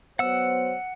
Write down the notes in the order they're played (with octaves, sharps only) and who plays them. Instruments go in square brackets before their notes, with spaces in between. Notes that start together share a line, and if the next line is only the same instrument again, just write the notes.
[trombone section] F#3 B3 C5 [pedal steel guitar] F#5 E6